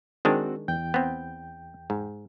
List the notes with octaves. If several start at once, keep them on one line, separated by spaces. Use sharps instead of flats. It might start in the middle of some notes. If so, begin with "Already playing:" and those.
D#3 G#3 C4 D4 F#4
E2 G5 G6
B3 C4
G#2